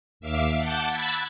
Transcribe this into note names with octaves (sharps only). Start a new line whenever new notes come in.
D#2 E5 F5 D6
F#5 A5 D6 G6
B5 E6 F#6 G#6 A6 B6